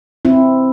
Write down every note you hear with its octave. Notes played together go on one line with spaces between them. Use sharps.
C4 E4